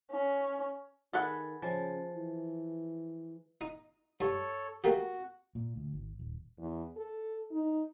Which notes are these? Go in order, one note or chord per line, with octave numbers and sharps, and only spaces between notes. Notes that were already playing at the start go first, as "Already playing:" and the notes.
C#4
D#3 G#4 A4 B4 F#5
C#3 F3 G#3
E3
D#4
G2 A4 C#5
A3 A#3 F#4 G4
A#2
D2
G#1
D#1
E2
A4
D#4